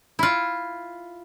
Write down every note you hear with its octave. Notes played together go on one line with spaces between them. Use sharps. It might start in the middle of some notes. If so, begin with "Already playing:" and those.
E4 F4